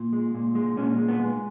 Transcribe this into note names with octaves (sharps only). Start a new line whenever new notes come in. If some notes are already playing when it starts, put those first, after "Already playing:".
Already playing: A#2
G#3
A#2
G#3
A#2 C#4
G#3
B3
G#3